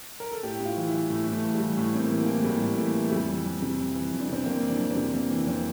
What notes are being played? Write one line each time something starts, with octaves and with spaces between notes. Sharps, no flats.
A#4
A4
A2 G4
A2
F4
E3
E4
E3
A2 A3
A2
A3
E3
G3
E3
A2 A3
A2 C4
A#3
E3
A#3
E3
A3
A2 G3
A2
A#3
E3 A3
E3
A3
F2 G3
E3
F2
C3
F2
E3
F2
D4
C3 C4
F2 A#3
E3
D4
F2
C4
C3
F2 A#3
E3
F2 C4